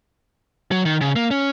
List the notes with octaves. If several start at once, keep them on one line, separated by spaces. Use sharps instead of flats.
F#3
D#3
C#3
A#3
C#4